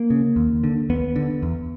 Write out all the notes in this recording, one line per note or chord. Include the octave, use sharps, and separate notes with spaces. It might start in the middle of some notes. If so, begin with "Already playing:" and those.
Already playing: A#3
C#3
D#2
D3
D#2 B3
D3
E2